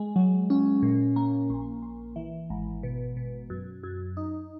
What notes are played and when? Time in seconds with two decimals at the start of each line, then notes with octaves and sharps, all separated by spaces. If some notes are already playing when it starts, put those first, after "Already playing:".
Already playing: G#3
0.16 F#3
0.50 C#4
0.82 A#2
1.16 A#3
1.50 A#1
1.83 A#1
2.16 E3
2.50 G#1
2.83 B2
3.17 B2
3.50 F#2
3.83 F#2
4.17 D#4